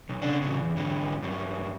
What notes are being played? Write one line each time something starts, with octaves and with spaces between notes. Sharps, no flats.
B1
C#3 D4
A2 C#3
E2
G#2 D3
G2 F#3